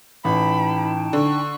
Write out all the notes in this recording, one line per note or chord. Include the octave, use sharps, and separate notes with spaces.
A1 D#4 G5 A5 B5
D3 C#6